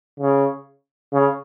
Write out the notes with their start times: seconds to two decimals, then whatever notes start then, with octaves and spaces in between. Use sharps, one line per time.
0.20 C#3
1.13 C#3